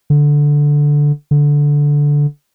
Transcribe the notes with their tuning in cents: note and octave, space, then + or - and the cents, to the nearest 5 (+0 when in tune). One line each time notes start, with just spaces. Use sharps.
D3 -5
D3 -10